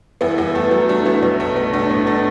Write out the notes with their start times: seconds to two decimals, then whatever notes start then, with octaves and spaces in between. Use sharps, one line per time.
0.21 E2 B3 E4
0.38 E2 B3
0.54 E2 A3
0.71 F#3 B3
0.88 F#3 A3 D4
1.05 F#3 B3 E4
1.22 B1 B3
1.40 B1 A3
1.56 B1 B3
1.73 B1 A3 D4
1.90 A2 B3
2.07 A3 D4